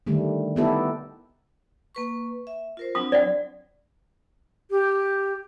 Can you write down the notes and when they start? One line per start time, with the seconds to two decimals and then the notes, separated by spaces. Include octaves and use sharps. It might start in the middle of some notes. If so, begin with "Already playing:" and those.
0.07 D3 D#3 G3 A3
0.56 B3 D#4 E4 G4 A4
1.95 A#3 B4 C#6
2.47 E5
2.77 F4 A#4 C5
2.95 F#3 C4 D4 D#6
3.12 D5 F#5
4.70 G4